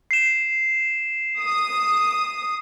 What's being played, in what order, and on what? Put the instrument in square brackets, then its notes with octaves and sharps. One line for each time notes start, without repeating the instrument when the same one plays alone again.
[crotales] C7 E7
[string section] D#6